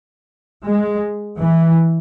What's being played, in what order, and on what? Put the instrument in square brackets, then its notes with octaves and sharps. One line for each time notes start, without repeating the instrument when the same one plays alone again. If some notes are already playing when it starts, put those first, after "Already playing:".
[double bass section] G#3
E3